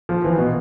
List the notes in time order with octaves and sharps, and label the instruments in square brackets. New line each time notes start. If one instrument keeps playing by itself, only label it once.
[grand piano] F3
E3
B2